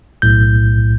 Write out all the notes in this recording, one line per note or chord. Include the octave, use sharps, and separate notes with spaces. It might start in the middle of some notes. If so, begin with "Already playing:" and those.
B1 A2 G6